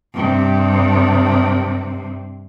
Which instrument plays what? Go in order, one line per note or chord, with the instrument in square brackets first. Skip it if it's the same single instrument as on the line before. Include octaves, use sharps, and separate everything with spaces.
[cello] G2 C3